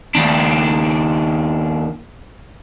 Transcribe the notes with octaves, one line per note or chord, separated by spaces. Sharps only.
D#2 D4